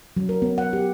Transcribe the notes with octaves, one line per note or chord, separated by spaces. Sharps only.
F#3
A#4
B3
F#5
G4